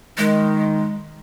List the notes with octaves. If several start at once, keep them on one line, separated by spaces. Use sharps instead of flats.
D#3 G#3